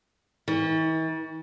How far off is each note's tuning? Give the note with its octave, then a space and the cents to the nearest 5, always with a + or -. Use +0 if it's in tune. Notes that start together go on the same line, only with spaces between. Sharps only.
E3 -45